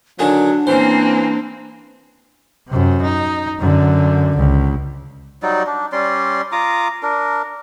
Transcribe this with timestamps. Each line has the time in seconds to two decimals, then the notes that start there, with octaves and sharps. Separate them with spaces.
0.19 D3 D#3 F#3 D4 G#4
0.67 E3 A#3 C4 C#4 C5
2.67 F#2 C3
3.02 D#4
3.59 F#2 D3
4.37 C#2
5.43 F#3 G3 D#4 D5
5.67 D4
5.92 G3 C#4 D5 C6
6.52 F4 A#5 D6 D#6
7.03 D4 A#4